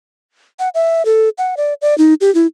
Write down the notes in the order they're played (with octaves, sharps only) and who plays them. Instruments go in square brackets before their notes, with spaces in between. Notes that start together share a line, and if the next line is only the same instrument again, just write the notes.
[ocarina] F#5
E5
A4
F#5
D5
D5
D#4
G4
E4